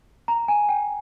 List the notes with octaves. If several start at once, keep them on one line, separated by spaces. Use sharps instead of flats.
A#5
G#5
G5